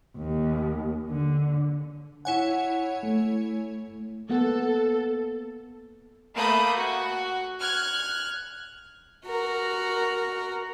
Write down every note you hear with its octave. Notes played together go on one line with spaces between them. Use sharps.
D#2
D3
E4 C#5 F#5 G#5
A3
A#3 B3 A4 F#5
A3 A#3 B5 D#6 G6
F#4
F6 F#6 G#6
F#4 A#4